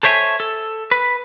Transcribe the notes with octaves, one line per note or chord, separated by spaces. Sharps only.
A4 C5 C#5 E5 G5 G#5
A4
B4